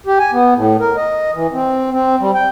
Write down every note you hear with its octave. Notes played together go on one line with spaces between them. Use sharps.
G4
G#5
B3
A2
A#4
D#5
E3
C4
C4
G3
G5